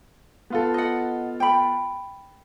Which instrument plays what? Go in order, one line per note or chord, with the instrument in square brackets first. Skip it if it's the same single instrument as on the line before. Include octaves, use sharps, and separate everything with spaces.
[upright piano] B3 F4 A4
[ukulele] D#5 F#5
G5 B5